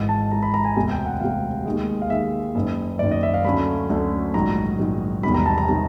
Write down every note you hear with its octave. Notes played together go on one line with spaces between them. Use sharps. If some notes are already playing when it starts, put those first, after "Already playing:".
Already playing: G#1 G#2 E3
A5
G#1 G#2 E3 A#5
B5
A#5
G#5
E1 D2 C3 G#5
G5
F#5
E1 D2 C3 F5
D#2 D#3 G#3
F5
D#2 D#3 G#3 E5
F#1 F#2 D#3
F#1 F#2 D#3 D5
D#5
E5
F5
D2 D3 F#3 A3 C#4 B5
D2 D3 F#3 A3 C#4
A#1 G#2 D#3 F#3 A#5
A#1 G#2 D#3 F#3
E1 E2 C3 D#3 G3 B5
A#5
A5
A#5
C3 D#3 G3 A5